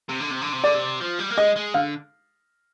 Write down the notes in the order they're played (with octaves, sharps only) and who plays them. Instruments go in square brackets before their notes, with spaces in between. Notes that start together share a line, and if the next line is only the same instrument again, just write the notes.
[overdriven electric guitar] C3
D3
C3
D3
C3
[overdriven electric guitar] D3 [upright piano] D5
[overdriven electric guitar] C3
F3
G3
A#3
[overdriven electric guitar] G#3 [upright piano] D#5
[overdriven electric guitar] G#3
[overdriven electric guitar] D3 [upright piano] F5